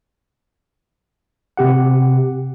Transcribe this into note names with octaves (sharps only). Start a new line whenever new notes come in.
C3 G4 F#5